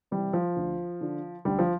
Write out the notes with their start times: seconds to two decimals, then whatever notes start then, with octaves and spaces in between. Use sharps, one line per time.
0.11 C3 E3 G3
0.33 F3
0.56 D2
1.01 D3
1.45 D2 G3
1.59 F3